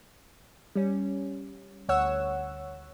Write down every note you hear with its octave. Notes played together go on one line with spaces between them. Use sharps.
G3 C#4
D2 C#5 F#5 E6